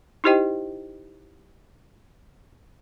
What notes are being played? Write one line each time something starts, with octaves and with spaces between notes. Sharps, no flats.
D#4 E4 G4 C5 D#5 G5